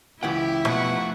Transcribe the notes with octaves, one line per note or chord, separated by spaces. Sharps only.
C#2 E3 E4 G4 F#5 G5
B2 F3 A3 F4 F#5 C#6